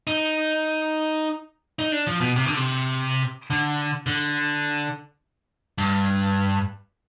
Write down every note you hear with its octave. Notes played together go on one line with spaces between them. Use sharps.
D#4
D#4
D4
F3
B2
C3
D3
C3
D3
D3
G2